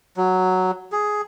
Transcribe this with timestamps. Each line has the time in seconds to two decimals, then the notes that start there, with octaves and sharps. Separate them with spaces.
0.17 F#3
0.92 G#4